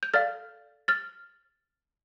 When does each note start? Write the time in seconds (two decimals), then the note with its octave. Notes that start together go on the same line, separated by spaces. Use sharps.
0.03 G6
0.14 A4 D5 F5 F6 A6
0.88 F6 A6